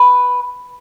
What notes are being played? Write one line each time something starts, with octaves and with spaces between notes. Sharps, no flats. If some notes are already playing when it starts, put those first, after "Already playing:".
Already playing: B4